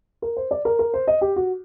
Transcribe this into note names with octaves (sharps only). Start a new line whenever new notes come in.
A#4
C5
D5
A#4
A#4
C5
D#5
G4
F#4